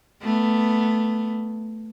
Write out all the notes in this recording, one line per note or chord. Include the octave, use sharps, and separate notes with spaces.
A3 B3